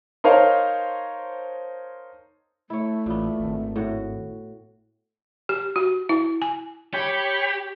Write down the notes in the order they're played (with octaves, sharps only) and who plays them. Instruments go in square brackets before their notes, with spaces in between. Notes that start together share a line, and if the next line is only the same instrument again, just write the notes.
[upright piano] D#4 A#4 C5 C#5 F5 A5
[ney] A3 [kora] E4 C#5
[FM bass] A1 [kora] A#2 B3
[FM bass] G#1
[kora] A2 F#4
[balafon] G4
F#4
E4
G#5
[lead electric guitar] G4 [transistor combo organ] C#5 G5 B5